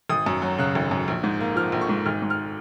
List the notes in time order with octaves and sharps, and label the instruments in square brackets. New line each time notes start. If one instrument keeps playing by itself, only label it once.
[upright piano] G#1 D#6
F#2
F#3
C#3 F#6
G#1
F#2
A#1
G#2
A#3
F3 F6
A#1
C#6
G#2
G#1 F6
G#2
F6